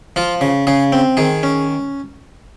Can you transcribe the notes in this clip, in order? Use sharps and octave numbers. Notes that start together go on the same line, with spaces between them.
F3 F4
C#3
C#3 G#4
C4
D#3 G#4
C#4